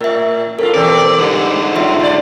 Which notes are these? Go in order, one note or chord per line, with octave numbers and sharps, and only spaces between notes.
A2 A#4 E5
A2 C4 F4 A4 A#4
B2 E3 C4 D5
G#2 D3 G3
F#3 F4 E5 C6
D4 F4 D5